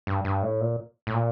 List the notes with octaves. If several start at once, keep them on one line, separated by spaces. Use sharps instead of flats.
G2
G2
A2
A#2
A2
A#2